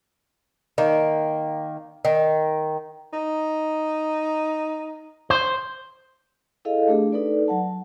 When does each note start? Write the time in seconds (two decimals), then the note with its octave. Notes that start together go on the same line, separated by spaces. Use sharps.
0.78 D#3 A#3
2.05 D#3
3.13 D#4
5.30 C5
6.65 E4 G#4 A4 D#5 F5
6.88 A3 D4 G4 G#4
7.12 D#4 A4 B4 D5
7.48 F#3 F#5 A5